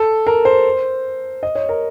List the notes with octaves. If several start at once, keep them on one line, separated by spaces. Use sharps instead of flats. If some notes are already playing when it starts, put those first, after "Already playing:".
Already playing: A4
A#4
C5
D#5
C#5
A#4